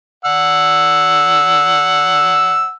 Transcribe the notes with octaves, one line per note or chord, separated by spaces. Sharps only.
F#5 E6